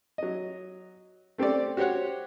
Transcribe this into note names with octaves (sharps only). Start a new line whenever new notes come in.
F#3 D#5
A3 C4 G4 A4 D5
F#4 G4 C5 C#5 F#5